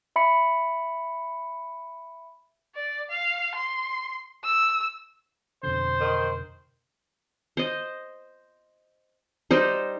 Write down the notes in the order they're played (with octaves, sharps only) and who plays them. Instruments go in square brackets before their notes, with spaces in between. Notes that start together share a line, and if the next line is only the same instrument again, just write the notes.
[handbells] E5 B5 C#7
[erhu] D5
F5
C6
E6
[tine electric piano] F2 B2 D3 [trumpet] C5
[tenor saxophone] D#3
[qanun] C5 D#5
G3 D#4 C5